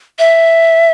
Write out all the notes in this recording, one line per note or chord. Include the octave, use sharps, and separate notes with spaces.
E5